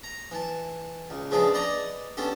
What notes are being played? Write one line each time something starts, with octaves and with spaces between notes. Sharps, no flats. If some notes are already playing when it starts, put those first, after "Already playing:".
A#5
E3 A5
C#2
C#3 F3 G#3 B3 D4 G#4
B4 D5 D#5 G#5 A#5
B3 C#4 D4 G4 A4